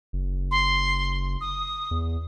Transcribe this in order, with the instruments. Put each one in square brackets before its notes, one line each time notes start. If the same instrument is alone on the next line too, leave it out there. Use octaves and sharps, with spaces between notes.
[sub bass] F#1
[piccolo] C6
D#6
[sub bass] E2